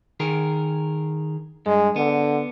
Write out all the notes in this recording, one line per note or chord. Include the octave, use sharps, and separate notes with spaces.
D#3 G#4 A#4
G2 G#3
D3 B3